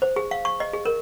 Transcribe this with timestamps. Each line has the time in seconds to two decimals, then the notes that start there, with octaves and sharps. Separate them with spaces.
0.02 C5
0.16 G#4
0.31 F5
0.45 C#6
0.60 D#5
0.73 G#4
0.85 A#4